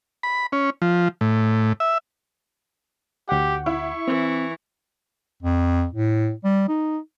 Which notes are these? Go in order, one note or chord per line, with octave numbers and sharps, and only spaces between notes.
B5
C#4
F3
A2
E5
D2 G4 F#5
E4 C#6
E3 C4
F2
A2
G3
D#4